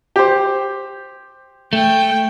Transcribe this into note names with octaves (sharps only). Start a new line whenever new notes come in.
G4 C5
A3 G5